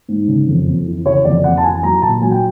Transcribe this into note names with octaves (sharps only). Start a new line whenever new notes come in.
G#2
C#3
F2
F2
E3
C#3 C#5
F2 D5
F2 F#5
A5
E3 G#5
F#3 A#5
A#2 A5
F#3 G#5
G5